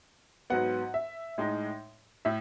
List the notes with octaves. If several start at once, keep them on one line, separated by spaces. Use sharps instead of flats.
G#2 F#3 B3 F#5
E5
A2 G#3 D#4
A2 E5